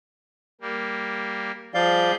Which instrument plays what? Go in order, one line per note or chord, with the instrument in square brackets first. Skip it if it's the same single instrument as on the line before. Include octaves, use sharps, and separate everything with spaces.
[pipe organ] G3 A#3
[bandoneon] F3 D5 F5 [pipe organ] G3 G#4 G6